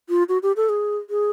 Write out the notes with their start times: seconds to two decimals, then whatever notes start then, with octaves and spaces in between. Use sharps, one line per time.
0.09 F4
0.29 F#4
0.43 G4
0.57 A4
0.69 G#4
1.10 G#4